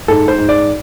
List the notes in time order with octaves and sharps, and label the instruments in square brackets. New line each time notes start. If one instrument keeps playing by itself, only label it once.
[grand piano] G#2 A4
C5
G#2
D5